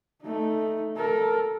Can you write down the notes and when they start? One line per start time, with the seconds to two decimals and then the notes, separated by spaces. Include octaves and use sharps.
0.22 A3 D#4
0.96 A4 A#4